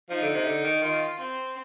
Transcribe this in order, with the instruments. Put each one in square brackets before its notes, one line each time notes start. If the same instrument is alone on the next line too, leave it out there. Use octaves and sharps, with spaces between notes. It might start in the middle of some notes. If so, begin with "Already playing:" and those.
[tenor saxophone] F3 [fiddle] D#4
[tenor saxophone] D3
C3
D3
D#3
[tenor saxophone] D#3 [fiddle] F4
[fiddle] C4